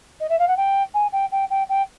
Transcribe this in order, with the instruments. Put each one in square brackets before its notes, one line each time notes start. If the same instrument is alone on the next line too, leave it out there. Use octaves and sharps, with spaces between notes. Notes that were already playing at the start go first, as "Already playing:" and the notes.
[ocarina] D#5
E5
F5
F#5
G5
G#5
G5
G5
G5
G5